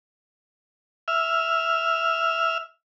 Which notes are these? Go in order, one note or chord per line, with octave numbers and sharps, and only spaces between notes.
E5 F6